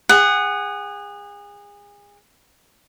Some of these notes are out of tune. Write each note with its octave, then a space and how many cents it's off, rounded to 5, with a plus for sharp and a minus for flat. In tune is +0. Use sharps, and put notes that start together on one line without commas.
G#4 -30 F#5 +10